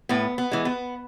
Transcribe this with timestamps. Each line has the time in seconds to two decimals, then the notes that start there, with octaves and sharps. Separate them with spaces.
0.09 A2 B3
0.38 B3
0.51 E3 G#3
0.65 B3